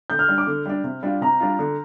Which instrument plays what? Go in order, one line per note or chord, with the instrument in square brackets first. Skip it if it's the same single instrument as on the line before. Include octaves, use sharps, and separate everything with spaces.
[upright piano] D3 [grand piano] G6
[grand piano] F6
[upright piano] G3 D4
[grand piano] D6
[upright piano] D3
G3 D4
C3
G3 D4 F4
[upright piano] C3 [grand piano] A#5
[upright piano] G3 D4 F4
D3